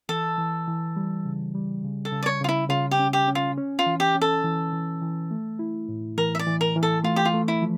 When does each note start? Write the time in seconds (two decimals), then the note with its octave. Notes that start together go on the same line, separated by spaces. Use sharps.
0.09 E3 A4
0.38 E3
0.68 E3
0.96 G3
1.25 C#3
1.55 G3
1.83 C#3
2.05 A4
2.12 C#3
2.23 D5
2.26 C#5
2.41 C#3 F4
2.49 E4
2.69 C#3 F4
2.91 G4
2.99 C#4
3.13 G4
3.28 C#4
3.35 F4
3.57 C#4
3.79 F4
3.86 E3
4.00 G4
4.15 C#4
4.22 A4
4.44 E3
4.73 E3
5.02 E3
5.31 A3
5.59 E4
5.89 A2
6.18 E3 A#4
6.35 E5
6.39 D5
6.46 E3
6.61 A#4
6.76 E3
6.83 A4
7.04 A3 F4
7.16 G4
7.25 F4
7.33 A3
7.48 E4
7.62 F3